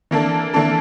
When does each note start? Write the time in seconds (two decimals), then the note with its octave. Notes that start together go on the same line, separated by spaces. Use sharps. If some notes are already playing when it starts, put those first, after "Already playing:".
0.11 E3 A#3 D4 A4
0.54 E3 A#3 D4 A4